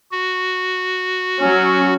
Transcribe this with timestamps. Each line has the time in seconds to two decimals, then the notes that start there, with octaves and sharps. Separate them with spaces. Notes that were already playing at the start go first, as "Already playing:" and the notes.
0.12 F#4
1.41 F#3 C#4